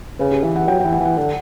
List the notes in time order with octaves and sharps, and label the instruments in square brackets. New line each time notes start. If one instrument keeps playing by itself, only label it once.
[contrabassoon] C#3 [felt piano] B4
[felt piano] G4
[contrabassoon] E3 [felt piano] G4
[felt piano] F#5
[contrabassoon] F#3 [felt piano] G5
[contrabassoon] F#3 [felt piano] G5
[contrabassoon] E3
[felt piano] F#5
[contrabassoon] E3
[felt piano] F#5
[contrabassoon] D3 [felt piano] F#5